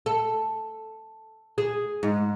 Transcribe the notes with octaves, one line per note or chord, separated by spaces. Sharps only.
A4
G#4
G#2